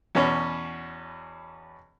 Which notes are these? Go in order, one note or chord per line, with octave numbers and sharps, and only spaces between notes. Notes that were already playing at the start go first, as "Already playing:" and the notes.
E2 B2 C#4